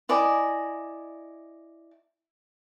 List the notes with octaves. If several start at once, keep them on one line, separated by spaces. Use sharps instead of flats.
E4 D5 D#5 G#5